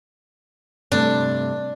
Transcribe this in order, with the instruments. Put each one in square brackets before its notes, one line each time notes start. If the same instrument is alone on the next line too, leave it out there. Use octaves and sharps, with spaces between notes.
[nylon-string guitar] G2 C3 A3 [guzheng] D4